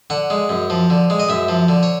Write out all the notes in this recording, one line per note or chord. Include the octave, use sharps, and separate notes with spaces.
D3 F#5
G#3
F#2
F3
D3
G#3
D#5
F#2 E5
F3
D3
C#5